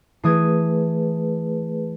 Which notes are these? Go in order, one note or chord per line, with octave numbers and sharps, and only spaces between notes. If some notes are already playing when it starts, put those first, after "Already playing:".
E3 A3 G#4 B4 D#6 G#6